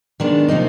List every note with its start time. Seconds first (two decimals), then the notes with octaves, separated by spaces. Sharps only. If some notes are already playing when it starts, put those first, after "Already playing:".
0.20 D#3 G#3 B3 D4
0.48 C3 F3 A#3 D#4